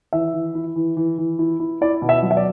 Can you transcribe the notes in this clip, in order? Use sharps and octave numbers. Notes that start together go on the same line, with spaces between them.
E3 E5
E3
E4
E3
E3
E3
E4
E4
E4 D5
B2
E5
F#3
E5
D5